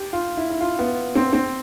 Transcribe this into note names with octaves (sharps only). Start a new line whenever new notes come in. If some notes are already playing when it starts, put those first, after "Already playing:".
Already playing: G4
F4
E4
E4
F4
B3
C4
C4